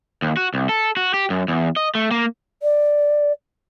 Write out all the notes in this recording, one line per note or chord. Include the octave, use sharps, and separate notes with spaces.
D#2
F#4
C2
A4
F#4
G4
F#2
E2
D#5
A3
A#3
D5